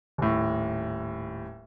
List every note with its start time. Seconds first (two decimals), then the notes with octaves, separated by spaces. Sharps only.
0.18 D#1 A2